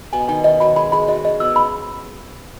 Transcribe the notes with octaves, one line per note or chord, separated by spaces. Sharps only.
B2 B3 G#5
D#3 D#4 G#5
D#3 D#4 D#5
F#3 F#4 B5
G#3 G#4 B5
G#3 G#4 B5
F#3 F#4 D#5
G#3 D#5
B2 B3 E6
C#3 C#4 B5